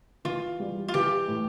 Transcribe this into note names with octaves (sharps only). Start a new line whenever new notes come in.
E3 F4
G3
F4
E3 G4
A2